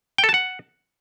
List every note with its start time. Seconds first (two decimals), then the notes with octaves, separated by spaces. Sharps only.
0.18 G5
0.24 A4
0.29 A5
0.34 F#5